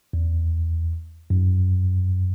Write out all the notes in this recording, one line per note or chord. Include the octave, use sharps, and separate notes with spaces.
E2
F#2